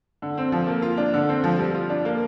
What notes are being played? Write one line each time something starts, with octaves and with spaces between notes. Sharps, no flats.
D3
C4
F3
A#3
F4
D4
D3
C4
F3
G3
F4
D4
A#3